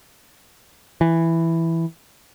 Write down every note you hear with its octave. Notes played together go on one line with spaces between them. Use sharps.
E3